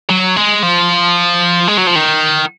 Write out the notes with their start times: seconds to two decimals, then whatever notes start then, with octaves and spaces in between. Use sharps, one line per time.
0.09 F#3
0.36 G#3
0.63 F3
1.68 G#3
1.77 F#3
1.87 F3
1.96 D#3